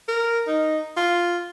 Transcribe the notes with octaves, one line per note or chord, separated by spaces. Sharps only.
A#4
D#4
F4